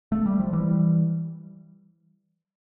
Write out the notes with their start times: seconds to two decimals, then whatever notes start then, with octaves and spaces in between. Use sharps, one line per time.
0.12 A3
0.26 G3
0.39 F3
0.53 E3 G3